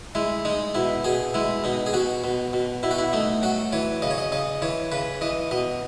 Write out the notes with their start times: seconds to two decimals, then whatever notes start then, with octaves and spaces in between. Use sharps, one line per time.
0.15 G#3 E4
0.45 G#3 D#4
0.75 B2 E4
1.04 B2 G#4
1.34 G#3 E4
1.64 B2 D#4
1.86 G#4
1.93 B2 F#4
2.24 B2
2.53 B2
2.83 B2 E4
2.91 F#4
2.98 E4
3.13 A3 D#4
3.43 F#3 F#4
3.73 E3 C#5
4.02 C#3 D#5
4.10 C#5
4.18 D#5
4.32 C#3 D#5
4.62 E3 C#5
4.92 C#3 B4
5.21 E3 D#5
5.51 B2 D#5